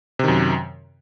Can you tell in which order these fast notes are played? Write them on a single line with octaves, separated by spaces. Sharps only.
C3 D#3 F#2